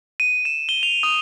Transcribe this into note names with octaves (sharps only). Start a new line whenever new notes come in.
D#7
E7
G7
F7
D#6